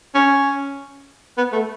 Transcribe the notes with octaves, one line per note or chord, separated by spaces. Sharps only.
C#4
B3
A3